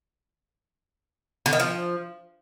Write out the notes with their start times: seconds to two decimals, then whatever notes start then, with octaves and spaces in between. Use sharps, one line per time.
1.46 D3
1.53 D#3
1.60 F3